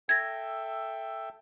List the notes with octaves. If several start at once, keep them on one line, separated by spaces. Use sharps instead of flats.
A4 E5 G5 G#6 A#6